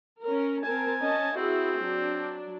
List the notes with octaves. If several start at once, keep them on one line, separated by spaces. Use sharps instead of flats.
C#4 A#4
C4 A#4 G#5 A5
C#4 D#5 A5
C4 E4 F#4 G#4
F#3 D4